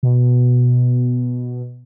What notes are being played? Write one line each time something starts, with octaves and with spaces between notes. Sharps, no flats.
B2